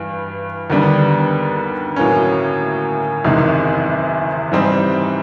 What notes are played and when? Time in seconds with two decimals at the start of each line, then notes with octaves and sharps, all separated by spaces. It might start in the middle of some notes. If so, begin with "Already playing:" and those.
Already playing: G2 E3 G3
0.70 D#2 D3 G3 B3 D4
1.96 A2 F#3 A#3 C#4
3.24 F#1 E2 C3 D#3 G#3
4.52 G#2 E3 G3 C4 D#4